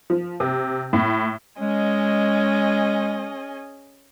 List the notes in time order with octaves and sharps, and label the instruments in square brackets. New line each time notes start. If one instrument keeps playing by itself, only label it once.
[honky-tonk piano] F3
C3
A2
[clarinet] G#3 [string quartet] C#4 G#4 D#5